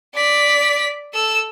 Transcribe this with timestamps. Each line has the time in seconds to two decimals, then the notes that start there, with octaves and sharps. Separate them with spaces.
0.14 D5 B6
1.14 A4 E6